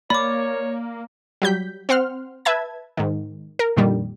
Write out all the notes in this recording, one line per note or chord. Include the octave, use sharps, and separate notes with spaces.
A#3 C#5 D5 B5 D6
F#3 G3 G6 B6
C4 C5 F#5 C6 F6
B4 E5 A5 G#6
G#2 D#3
A#4
F2 A#2 D3 D#3 G3